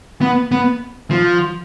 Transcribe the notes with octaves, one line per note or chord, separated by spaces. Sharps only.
B3
B3
F3